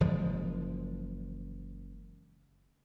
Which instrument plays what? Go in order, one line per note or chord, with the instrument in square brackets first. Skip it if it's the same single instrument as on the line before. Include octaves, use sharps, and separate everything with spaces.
[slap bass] F#1 E3 F3 G#3